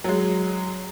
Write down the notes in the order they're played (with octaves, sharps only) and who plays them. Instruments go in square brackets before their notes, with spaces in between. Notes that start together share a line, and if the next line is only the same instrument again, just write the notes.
[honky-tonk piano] F#3 G#3